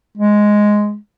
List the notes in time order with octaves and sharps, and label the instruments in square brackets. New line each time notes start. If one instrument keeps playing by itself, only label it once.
[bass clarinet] G#3